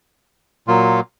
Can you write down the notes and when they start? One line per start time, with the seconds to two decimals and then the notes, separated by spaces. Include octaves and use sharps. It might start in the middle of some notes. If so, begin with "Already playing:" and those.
0.68 A#2 F#3 A#3 F4